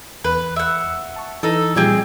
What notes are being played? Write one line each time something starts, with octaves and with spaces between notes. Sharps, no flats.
E2 B4
E5 F#5
A5 C#6
E3 D#4 A4
A#2 F3 G3 C4 G#4 D5